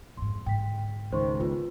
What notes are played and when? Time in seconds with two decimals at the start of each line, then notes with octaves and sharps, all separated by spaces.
0.17 F2 G#2 C6
0.46 G#2 D3 G5 B6
1.12 C#2 D#3 C5 C6 C#6
1.40 D3 B3 F4 B4